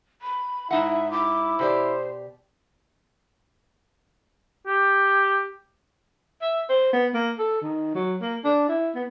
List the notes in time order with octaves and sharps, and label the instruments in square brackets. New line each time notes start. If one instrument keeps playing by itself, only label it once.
[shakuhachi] B5
[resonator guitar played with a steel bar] G#2 D#4 F#5 [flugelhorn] E4 [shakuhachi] E5
[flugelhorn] E4 [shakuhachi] D6
[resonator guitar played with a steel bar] B2 G4 D5 [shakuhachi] C5
[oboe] G4
[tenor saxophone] E5
C5
B3
A#3
A4
D#3
F#3
A#3
D4
E4
B3